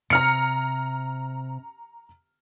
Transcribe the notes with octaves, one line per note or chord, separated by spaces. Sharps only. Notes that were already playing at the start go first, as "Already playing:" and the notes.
C3 A#5 F6 C#7